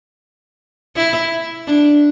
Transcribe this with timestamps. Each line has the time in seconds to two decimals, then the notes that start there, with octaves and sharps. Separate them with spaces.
0.97 E4
1.67 D4